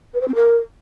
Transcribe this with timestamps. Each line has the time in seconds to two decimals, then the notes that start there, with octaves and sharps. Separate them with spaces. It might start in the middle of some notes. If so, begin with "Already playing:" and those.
0.14 B4
0.21 C5
0.28 C4
0.35 A#4